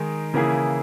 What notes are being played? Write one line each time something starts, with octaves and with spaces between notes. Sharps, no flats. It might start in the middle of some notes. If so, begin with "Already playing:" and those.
Already playing: D#3 G#3 D#4 G#4
C#3 E3 A#3 E4 G#4